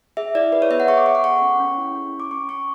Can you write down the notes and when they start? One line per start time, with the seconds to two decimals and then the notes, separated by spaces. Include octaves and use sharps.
0.17 G#4 E5
0.35 E4 D5
0.52 G#4 B4
0.62 C#5
0.70 B3 E5
0.80 F#5
0.88 G#4 C#6
0.97 D6
1.06 G#4 C#6
1.15 F#5
1.24 A4 C#6
1.42 C#4
1.60 C#4
1.78 E4
1.95 C#4
2.13 C#4
2.20 D6
2.31 C#4 C#6
2.49 C#4 C#6